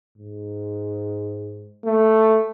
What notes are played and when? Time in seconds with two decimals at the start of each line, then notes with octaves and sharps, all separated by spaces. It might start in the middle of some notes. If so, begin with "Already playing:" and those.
0.18 G#2
1.85 A3